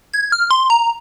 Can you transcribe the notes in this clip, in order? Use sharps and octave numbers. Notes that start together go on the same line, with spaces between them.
G#6
F6
C6
A#5